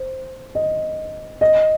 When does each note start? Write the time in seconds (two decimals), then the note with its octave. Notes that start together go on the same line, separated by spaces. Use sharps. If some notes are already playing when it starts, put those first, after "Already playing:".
Already playing: C5
0.55 D#5
1.41 D#5